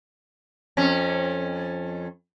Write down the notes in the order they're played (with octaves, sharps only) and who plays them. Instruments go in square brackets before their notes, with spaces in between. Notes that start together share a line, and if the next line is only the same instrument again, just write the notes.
[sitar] F2 C#4